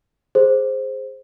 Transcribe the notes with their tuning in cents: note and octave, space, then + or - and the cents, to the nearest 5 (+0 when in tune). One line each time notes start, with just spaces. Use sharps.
G#4 +0 C5 +0